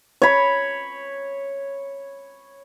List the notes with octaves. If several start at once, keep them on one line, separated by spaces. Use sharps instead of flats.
C#5 B5